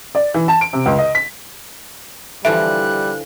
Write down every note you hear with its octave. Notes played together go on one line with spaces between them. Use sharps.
D5
E3
A5
D7
C3
C#2
D#5
B6
D3 E3 F3 G3 E5 F#6